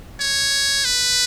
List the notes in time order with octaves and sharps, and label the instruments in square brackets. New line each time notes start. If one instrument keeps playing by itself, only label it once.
[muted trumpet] C#5
B4